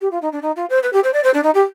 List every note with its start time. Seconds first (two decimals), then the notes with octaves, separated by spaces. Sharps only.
0.01 G4
0.11 F4
0.22 D#4
0.32 D4
0.42 D#4
0.56 F4
0.70 C5
0.83 B4
0.93 G4
1.04 C5
1.13 D5
1.24 C5
1.34 D4
1.43 D#4
1.54 G4